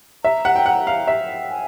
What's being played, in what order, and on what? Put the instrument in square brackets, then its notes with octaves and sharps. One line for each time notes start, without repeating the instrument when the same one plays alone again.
[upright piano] E5 [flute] A#5
[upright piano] F#5
G5
F#5
F5
E5
[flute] G#5